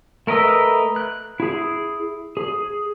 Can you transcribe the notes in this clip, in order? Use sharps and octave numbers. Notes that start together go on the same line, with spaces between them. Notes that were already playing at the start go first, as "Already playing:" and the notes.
A3 A#4 B4 D#5 E6
F#6
E4 G#4
G#4